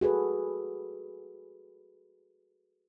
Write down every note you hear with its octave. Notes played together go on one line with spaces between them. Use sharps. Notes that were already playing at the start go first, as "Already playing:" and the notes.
F#4 G#4 A4 B4